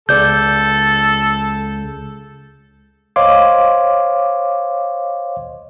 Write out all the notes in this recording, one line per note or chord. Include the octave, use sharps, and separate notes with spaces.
C#2 A4 D5 G6
C5 C#5 D#5 F5 C6 D6